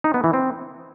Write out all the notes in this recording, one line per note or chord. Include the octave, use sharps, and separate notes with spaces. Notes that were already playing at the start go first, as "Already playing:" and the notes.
D#4
B3
E3
C4